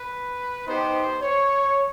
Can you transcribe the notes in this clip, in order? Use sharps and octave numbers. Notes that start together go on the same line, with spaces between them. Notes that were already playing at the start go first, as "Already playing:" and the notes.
Already playing: B4
B3 D#4 G4 C5
C#5